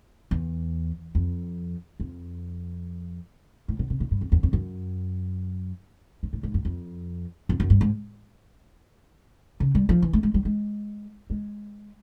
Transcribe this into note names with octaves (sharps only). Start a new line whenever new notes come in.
E2
F2
F2
A2
B2
C3
A#2
G2
F2
E2
F2
F#2
G2
A2
G#2
F#2
F2
F2
F#2
G2
G#2
C#3
G3
F3
E3
A3
G#3
G3
G#3
G#3